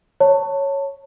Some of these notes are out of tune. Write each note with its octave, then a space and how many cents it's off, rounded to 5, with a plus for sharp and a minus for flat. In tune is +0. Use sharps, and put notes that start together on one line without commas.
C#5 +0 A5 +25